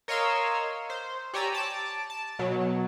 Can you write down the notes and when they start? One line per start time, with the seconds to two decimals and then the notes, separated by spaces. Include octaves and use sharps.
0.08 A#4 C#5 D#5 F5 C6 E6
0.90 C5
1.34 G4 C#5 D5 G#5 A#5 E6
1.54 A5 D6
2.10 A5
2.39 B2 F#3